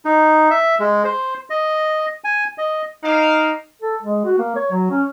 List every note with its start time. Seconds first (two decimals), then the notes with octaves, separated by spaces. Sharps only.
0.05 D#4
0.51 E5
0.79 G#3
1.04 C5
1.50 D#5
2.24 G#5
2.58 D#5
3.04 A#3 D#4 F5
3.82 A4
4.03 G#3
4.25 F#4
4.39 A#3
4.56 C#5
4.72 F#3
4.91 C#4